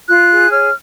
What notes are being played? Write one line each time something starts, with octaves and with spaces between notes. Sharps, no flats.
F4 F#6
G#4
C#5 F6